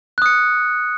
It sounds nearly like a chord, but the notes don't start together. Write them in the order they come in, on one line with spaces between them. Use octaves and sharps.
F#6 D#6 C#7